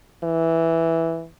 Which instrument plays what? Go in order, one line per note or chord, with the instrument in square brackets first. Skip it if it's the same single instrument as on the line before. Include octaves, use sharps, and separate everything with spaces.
[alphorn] E3